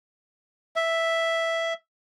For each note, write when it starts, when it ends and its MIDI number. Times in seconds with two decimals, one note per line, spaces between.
0.76 1.74 76